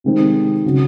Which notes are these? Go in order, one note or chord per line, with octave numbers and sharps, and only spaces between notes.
C3 D#3 G#3 C4 D#4
C#3 F#3